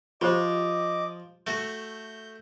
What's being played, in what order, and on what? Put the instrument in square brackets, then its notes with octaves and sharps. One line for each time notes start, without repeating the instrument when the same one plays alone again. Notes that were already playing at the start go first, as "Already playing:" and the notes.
[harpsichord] F3 [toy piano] F4 G4 C5 [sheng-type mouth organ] D#5 D6
[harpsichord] A3 F#4 [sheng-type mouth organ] G6